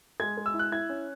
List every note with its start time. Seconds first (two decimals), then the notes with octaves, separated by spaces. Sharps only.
0.20 G#3 G#6
0.37 G#3
0.46 E6
0.54 E4
0.59 F#6
0.72 E4 G#6
0.89 C#4